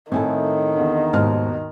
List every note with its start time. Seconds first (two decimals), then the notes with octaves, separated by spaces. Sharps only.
0.12 A2 D#3 C4 E4 A4 G#5
0.76 E2 D3
1.13 D#2 G#2 B2 F6